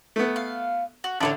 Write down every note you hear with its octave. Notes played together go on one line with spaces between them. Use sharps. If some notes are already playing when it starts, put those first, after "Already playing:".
A3 B3
F5
F#4
A1 D3 D4 B4 C#5